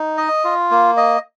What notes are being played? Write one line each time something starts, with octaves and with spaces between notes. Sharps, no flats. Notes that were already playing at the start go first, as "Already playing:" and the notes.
Already playing: D#4
D#5
F4
A#3
D#5